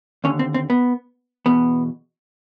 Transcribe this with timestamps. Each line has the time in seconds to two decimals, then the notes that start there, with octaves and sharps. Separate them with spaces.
0.24 D#2 D3 C#4
0.39 C4
0.54 C4
0.70 B3
1.46 E2 B2 B3